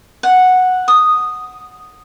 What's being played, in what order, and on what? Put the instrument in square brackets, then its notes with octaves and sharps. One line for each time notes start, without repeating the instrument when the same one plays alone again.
[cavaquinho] F#5
D#6